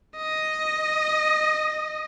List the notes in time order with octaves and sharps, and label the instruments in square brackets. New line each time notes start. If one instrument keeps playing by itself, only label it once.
[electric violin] D#5